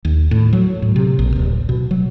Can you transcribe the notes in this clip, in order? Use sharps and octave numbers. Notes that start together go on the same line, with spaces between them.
D#2
A2
F#3
A2
C3
A#1
D1
B2
F#3